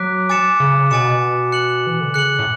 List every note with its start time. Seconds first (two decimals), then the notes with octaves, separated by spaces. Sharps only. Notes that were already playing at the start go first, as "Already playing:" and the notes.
Already playing: F#3 D6 F#6 B6 D7
0.29 G#5 D6 A6 C#7 E7
0.60 C#3
0.90 B2 G#5 D6 A6 C#7 E7
1.52 F#6 C#7 F#7
1.87 E3
2.01 D3
2.14 C#3 F#6 C#7 F#7
2.39 A2